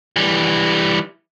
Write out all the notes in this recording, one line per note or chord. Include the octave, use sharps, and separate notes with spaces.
E3 G3